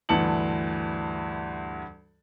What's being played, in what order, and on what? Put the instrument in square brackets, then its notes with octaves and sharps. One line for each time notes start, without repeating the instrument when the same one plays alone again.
[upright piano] D2 G2 E3 A5 C#7 F#7